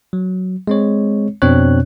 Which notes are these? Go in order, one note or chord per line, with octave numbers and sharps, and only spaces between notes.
F#3
G#3 C4 C#5
F2 B2 C4 D4 C#5 F#6